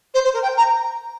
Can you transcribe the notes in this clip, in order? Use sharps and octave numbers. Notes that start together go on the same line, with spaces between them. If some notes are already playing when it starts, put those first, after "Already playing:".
C5
C5
A#4
G5
A#5